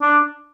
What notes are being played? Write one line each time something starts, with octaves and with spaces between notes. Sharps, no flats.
D4